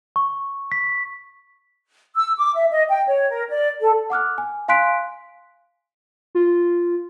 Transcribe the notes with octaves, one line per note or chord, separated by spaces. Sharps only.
C#6
B6
E6
D6
E5
D#5
G5
C#5
A#4
D5
A4
F#5 D6 F6 F#6
G#5
F5 G#5 C6 F#6 B6 D7
F4